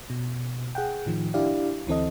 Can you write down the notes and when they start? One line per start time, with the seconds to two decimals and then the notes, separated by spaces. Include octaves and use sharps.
0.10 B2
0.75 G#4 F#5 G5
1.06 A2 D#3 F3
1.34 D4 E4 G4 D5 F5
1.87 D2 E3 C4 A4 D#5